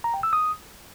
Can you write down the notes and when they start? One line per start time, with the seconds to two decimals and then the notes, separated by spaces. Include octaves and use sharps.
0.04 A#5
0.14 G5
0.23 E6
0.33 D#6